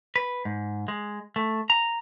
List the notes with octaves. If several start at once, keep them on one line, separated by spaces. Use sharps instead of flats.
B4
G#2
G#3
A3
A#5